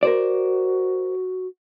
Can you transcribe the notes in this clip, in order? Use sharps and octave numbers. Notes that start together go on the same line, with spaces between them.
F#4 A#4 C5 D5